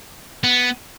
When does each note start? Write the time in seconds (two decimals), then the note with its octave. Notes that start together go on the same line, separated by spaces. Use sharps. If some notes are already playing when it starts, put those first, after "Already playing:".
0.44 B3